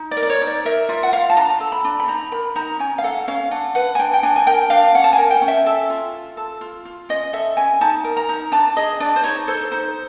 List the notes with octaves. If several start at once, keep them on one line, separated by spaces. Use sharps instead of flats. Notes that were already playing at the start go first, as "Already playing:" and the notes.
Already playing: D#4
D5
A#4
D5
C#5
D#4
D5
A#4 E5
F4 E5
F#5
F4 F5
A5
D4 A#5
A4
B5
D4
B5
D#4 A#5
A#4 B5
D#4 A#5
C#4 G#5
F5
A4 F#5
C#4 F5
D4 F#5
B4 F#5
G#5
D4 G5
G5
D4 G#5
G#5
A#4 G5
D4 F5
C#4 F#5
A5
G#5
A#4
G5
C#4
E5
A4
F4
F4
A4
F4
F4
C#4 D#5
A4 E5
C#4 G#5
D#4 A5
A#4
A#5
D#4
D4 A5
G#4 D#5
D4 D5
C5
D#4 C#5
A4 C5
D#4 C5